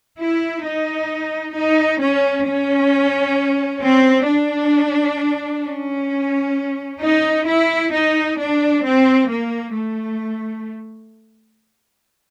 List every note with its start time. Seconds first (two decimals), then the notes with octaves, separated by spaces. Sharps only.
0.18 E4
0.63 D#4
1.54 D#4
1.99 C#4
2.46 C#4
3.82 C4
4.27 D4
5.63 C#4
7.01 D#4
7.46 E4
7.91 D#4
8.37 D4
8.82 C4
9.28 A#3
9.73 A3